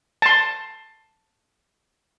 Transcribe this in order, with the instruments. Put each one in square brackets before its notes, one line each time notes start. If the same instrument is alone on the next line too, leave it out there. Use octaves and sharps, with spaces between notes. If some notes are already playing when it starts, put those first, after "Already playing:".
[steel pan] A5 C6